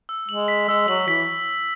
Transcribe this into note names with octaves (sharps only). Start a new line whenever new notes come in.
E6
G#3 F#7
B6
G#3 E6
F#3 F#7
E3 B6